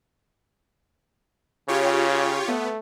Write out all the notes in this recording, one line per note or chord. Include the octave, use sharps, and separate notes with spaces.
C#3 F4 G4 C#5
A3 B3